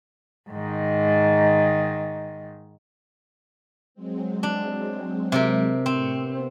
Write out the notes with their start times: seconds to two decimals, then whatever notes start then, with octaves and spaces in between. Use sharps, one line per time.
0.50 G#2 D#3
3.95 F#3 G#3 C4
4.43 D4
5.32 C3 G4 A#4
5.86 A2 C4 C#6
6.16 B3